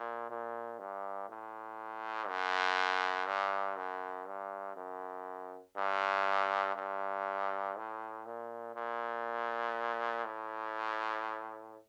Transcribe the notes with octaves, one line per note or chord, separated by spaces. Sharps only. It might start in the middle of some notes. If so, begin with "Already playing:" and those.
Already playing: A#2
A#2
G2
A2
F#2
G2
F#2
G2
F#2
G2
G2
A2
A#2
A#2
A2